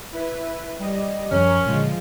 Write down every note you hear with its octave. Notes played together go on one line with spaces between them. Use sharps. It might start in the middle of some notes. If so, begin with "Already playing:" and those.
E4 B4
G3 D#5
F#2 F3 F#3 C#4 A#4
A#2 D3 F3 G#3 F4